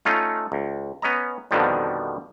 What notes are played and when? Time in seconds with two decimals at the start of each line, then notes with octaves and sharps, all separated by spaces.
0.05 A3 C#4 D#4 F4
0.52 C#2
1.02 B3 C#4 D#5 A#5
1.51 F2 B2 D3 D#3 F3 G3